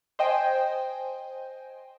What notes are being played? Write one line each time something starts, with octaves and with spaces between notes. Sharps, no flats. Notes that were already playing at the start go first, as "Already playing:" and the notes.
C5 D#5 G5 G#5